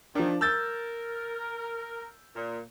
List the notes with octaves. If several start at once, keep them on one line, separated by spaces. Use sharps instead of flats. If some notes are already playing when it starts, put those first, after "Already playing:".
D#3 F3 D4
A#4 E6 G6 A6
A#2